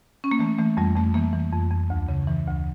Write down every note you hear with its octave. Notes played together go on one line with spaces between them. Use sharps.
C#4
A#3
E3 A3
E3 A3
F2 G3
F2 A3
E3 A#3
E3
F2
F2
D2
C#3
E3
D2